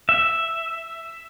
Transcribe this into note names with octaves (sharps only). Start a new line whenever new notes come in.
E5